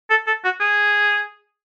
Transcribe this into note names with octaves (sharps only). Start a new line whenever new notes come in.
A4
A4
F#4
G#4